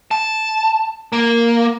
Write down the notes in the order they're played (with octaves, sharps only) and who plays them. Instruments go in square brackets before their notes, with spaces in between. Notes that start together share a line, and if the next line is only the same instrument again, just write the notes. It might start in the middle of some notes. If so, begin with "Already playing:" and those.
[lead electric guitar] A5
A#3